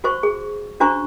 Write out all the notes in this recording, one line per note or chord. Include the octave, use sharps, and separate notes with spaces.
F#4 C5 C#6
G#4
C#4 D4 F#4 C5 A#5 C#6